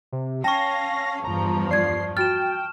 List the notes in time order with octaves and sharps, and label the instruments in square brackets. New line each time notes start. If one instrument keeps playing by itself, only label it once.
[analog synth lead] C3
[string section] C#4 F5 [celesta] G5 [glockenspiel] A5 C#6 [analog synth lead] A#6
[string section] E2 G2 F3 [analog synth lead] A#5
[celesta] D5 G#6 [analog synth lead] C7
[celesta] F#4 A6 [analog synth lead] G5 [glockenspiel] F6 E7